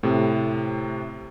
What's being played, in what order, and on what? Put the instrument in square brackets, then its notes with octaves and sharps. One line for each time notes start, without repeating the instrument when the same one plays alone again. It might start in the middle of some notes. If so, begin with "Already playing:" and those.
[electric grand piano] A2 C3